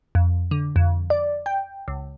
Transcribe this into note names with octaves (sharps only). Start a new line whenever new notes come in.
F2
D3
F2
D5
G5
C#2